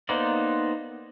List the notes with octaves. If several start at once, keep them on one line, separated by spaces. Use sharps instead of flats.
A#3 B3 D#4 C5 D5